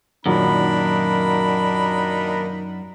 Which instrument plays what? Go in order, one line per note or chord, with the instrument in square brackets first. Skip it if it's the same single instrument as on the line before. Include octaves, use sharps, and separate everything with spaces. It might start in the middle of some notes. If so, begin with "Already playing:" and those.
[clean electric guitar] F#2 [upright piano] A#2 D#3 F#3 [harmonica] D4 D#4 B5 [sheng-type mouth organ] A#4